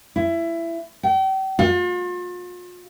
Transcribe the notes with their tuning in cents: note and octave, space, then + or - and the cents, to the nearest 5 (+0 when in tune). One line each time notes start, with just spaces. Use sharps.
E4 +20
G5 -40
F4 +40